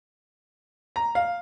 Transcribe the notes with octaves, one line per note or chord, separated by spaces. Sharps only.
A#5
F5